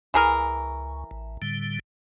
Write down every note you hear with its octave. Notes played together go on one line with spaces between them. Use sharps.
C#2 E3 G#4 A#4
A1
A2 D3 G3